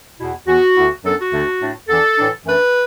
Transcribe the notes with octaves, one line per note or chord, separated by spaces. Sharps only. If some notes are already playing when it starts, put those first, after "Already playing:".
E2 B2 B3 E4
E2 E3 B3 F#4
D2 D3 B3 E4
F#2 F#3 B3 D4 A4
F#4
D2 D3 A3 D4
A2 A3 D4
E2 E3 D4 A4
A2 E3 D4
F#2 E3 A3 D4 B4